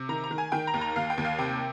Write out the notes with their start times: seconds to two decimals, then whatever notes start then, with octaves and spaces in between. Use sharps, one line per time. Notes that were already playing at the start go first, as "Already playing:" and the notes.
Already playing: C3
0.09 D#3 A#5
0.24 A#5
0.31 D#3
0.38 G#5
0.52 D#3 G5
0.67 A#5
0.74 D#2
0.81 A#5
0.96 D#2 F5
1.10 G5
1.18 D#2
1.25 F5
1.38 C3 G5